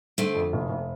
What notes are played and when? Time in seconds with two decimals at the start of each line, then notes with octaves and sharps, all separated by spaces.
0.18 D3 A3 C4
0.35 F2
0.53 F1
0.69 F1